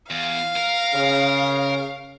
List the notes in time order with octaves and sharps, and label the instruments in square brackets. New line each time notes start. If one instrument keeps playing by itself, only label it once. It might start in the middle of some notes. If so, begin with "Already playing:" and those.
[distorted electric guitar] E2 [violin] F5
[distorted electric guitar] A#4
[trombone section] C#3